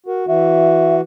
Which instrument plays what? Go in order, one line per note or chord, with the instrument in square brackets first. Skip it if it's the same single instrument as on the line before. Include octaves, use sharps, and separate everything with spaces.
[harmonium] F#4 [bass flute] A#4
[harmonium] E3 F#4 [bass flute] E5